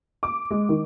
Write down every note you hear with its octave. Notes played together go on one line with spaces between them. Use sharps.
D6
G#3
D#3